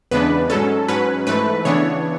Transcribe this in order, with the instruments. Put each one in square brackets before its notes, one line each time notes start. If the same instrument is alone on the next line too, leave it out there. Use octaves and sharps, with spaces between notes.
[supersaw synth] E2 C#3 G#3 B3 D4 B4
G#2 F#3 C#4 A4
G#2 F#3 C#4 B4
G#2 E3 A3 B4
C#3 E3 B3 D4 C#5